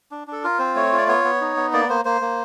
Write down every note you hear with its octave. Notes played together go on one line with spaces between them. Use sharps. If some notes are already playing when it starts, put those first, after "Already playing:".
D4
D4 A4
F4 A#4
C4 C5
A3 C#5
F4
D5
B3 C#5
B3
D#4
B3
A#3 D5
A#3 C5
A#3 C5
A#3